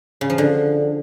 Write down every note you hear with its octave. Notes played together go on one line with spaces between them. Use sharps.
C#3
F3
D3